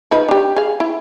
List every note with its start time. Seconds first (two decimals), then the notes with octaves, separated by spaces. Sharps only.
0.11 F3 D#4 B4
0.28 D4 G4
0.56 G#4 F5
0.80 E4